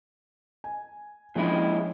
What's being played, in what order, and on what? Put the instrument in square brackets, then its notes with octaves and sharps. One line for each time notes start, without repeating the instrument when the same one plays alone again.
[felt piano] G#5
[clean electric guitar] A#2 G#3 E4 [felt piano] F3 C#4 D4